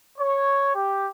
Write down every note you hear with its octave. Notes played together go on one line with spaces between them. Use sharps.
C#5
G4